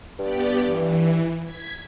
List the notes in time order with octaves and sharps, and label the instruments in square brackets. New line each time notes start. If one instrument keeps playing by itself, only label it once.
[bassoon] G2 [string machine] B3 G4 D5
[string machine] E3
G#6 B6